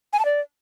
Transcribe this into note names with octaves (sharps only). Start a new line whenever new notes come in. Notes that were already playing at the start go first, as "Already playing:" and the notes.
G#5
A5
D5